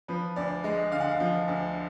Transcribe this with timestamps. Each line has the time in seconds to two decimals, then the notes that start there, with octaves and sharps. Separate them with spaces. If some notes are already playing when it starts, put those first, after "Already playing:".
0.08 F3 B4
0.36 D2 D5
0.64 G#3 D#5
0.91 D3 F5
1.00 F#5
1.08 F5
1.20 F3
1.48 D2